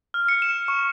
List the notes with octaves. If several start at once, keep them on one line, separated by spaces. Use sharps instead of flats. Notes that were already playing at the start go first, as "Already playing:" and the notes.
F6
C#7
E7
C#6